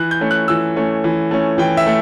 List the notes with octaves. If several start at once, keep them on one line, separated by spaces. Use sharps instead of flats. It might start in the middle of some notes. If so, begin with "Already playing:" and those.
Already playing: E3 F#6
G6
A3 C#4
F#6
E3 E6
A3 C#4
E3
A3 C#4
E3 G5
E5
A3